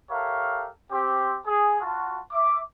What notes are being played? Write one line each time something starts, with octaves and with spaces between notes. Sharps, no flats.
G4 A4 A#4 C#5 E5 F5
C4 G4
G#4
F4 F#4 A5
E5 D6